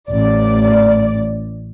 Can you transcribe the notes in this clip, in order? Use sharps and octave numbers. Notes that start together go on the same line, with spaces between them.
A1 D5